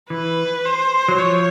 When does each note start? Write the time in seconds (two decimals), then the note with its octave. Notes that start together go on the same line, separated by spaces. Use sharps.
0.10 E3 B4
0.65 C5
1.08 F#3
1.18 F3 C#5